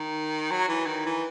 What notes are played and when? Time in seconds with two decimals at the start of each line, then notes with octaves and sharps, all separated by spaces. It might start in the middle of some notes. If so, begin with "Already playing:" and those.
Already playing: D#3
0.51 F#3
0.69 E3
0.87 D#3
1.06 E3